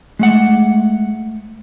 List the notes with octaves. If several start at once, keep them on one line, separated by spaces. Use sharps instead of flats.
G#3 A3 F#5